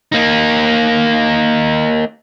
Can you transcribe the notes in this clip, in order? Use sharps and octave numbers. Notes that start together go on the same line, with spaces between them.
A#3 D#4